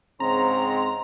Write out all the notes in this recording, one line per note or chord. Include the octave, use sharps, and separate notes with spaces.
G#2 C#3 C4 A#5 C6